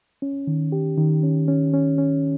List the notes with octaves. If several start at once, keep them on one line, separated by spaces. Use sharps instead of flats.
C#4
D#3
G4
D#3
C#4
C#4
C#4
C#4